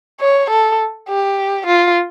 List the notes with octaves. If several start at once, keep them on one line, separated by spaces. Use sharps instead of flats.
C#5
A4
G4
F4